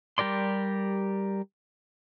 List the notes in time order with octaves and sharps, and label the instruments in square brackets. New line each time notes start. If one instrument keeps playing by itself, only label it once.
[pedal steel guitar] G3 G4 A#4 D5 C6